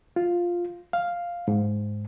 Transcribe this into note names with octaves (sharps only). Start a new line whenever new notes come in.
F4
F5
G#2